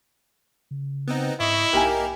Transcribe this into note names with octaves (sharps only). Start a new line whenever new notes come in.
C#3
B3 C4 D#4
G#2 E4 D#5 C#6
B1 A#3 D#4 G4 A#4 G#5